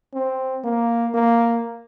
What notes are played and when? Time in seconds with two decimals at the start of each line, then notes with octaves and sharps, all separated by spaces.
0.14 C4
0.64 A#3
1.14 A#3